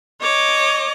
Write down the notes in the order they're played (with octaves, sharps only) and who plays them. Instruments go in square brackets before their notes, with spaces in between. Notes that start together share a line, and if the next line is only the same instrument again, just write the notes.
[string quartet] C#5 D#5 D6